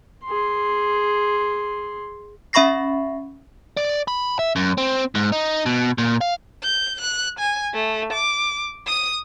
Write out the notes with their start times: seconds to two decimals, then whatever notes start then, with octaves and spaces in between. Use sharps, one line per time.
0.25 G#4 C6
2.53 C#4 E5 B5 C#6 A#6 C7
3.77 D5
4.08 B5
4.39 E5
4.56 F#2
4.78 C4
5.15 G#2
5.32 D#4
5.66 B2
5.98 A#2
6.21 F5
6.63 G6
7.01 F#6
7.39 G#5
7.73 A3
8.13 D6
8.87 D#6 D#7